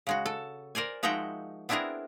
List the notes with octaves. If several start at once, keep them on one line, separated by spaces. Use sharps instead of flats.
C#3 G#3 F#4
A4
A#4 C5 D5 G#5
F3 G#3 D#4 F#4 E5 G5
B3 C4 D4 E4 G#4 A#4